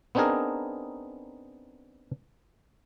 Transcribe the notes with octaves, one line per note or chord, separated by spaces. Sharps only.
B3 C4 D4 D#4 G#4 A#4